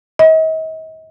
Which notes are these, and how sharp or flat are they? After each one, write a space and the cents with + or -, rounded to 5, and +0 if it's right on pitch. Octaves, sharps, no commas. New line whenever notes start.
D#5 +40